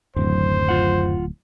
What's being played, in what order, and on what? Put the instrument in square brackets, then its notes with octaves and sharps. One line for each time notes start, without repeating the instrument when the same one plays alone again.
[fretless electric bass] D1 [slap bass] F#2 D#3 [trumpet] C5
[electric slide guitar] F4 F#5